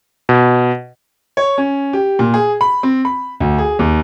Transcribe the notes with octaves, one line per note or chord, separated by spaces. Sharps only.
B2
C#5
C#4
G4
A#2
G#4
B5
C4
B5
D2
G#4
D#2